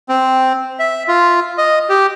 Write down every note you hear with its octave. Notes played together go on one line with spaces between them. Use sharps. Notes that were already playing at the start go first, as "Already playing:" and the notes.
C4
E5
F4
D#5
G4